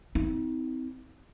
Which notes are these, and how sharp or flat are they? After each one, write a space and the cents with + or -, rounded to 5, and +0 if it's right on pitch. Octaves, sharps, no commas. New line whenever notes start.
C4 -15 D#4 +40